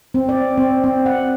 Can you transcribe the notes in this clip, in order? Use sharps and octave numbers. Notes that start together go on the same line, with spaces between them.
C4
D5
C4
C4
F#5